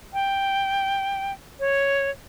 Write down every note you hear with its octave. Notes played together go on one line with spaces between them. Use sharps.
G5
C#5